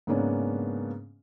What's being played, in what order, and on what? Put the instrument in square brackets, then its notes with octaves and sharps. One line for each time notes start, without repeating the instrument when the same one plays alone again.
[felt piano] G#2 C#3 A#3 B3 C#4 D4